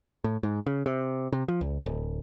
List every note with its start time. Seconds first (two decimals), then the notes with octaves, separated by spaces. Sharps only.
0.24 A2
0.43 G#2
0.67 C#3
0.86 C3
1.33 C3
1.48 F3
1.61 C#2
1.86 D1